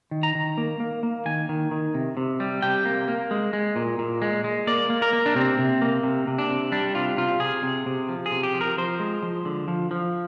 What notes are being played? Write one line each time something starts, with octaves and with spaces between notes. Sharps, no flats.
D#3
A#5
D#3
A#3
A#3
A#3
D#3 G#5
D#3
D#3
C3
C3
G3
C3 G5
A#3
A#3
G#3
G#3
A#2
A#2
G#3
G#3
A#3 D5
A#3
A#4
A#3
D4
C3 C4
C3
A#3
C3
C3
D4
C3
G3 D4
C3 F4
C3 F4
C3 G#4
C3
C3
F3
G#4
C3
G4
F3
A#4
F3 C5
G#3
F3
D3
F3
F3